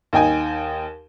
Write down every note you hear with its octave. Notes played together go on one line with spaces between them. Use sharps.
D#2 D#4 G5 G#5